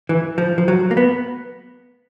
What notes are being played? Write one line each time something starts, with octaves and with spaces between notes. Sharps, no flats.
E3
F3
F3
F#3
A#3
B3